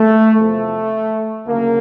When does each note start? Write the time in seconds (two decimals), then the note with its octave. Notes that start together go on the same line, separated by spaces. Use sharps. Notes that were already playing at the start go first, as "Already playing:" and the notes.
Already playing: A3
0.37 E2 C3 F3 A3
1.46 D2 C#3 F#3 A#3